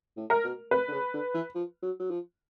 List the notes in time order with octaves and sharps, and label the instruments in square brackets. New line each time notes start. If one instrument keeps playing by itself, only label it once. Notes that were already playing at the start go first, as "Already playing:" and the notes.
[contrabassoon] A2
[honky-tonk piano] A#4
[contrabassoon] B2
[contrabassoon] C3 [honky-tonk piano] B4
[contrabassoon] D3
C#3
D3
E3
F3
F#3
F#3
F3